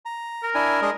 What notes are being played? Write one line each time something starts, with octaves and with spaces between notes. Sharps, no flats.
A#5
A#4
D4 E4 G#5
G#3 D4 D#5